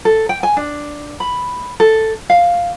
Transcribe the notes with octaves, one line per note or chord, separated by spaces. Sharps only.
A4
G5
G#5
D4
B5
A4
F5